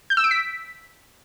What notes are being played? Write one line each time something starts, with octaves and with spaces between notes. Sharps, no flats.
G6
E6
D7
B6